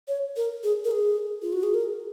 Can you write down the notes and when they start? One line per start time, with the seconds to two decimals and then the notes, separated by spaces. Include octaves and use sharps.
0.08 C#5
0.36 A#4
0.64 G#4
0.85 A#4
0.91 G#4
1.42 F4
1.53 F#4
1.63 G#4
1.74 A#4